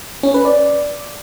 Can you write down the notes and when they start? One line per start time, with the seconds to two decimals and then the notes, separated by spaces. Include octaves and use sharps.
0.23 C#4
0.34 B4
0.45 D5